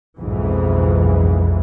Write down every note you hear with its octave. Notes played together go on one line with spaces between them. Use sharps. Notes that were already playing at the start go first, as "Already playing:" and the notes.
B1 F2 G#2 E3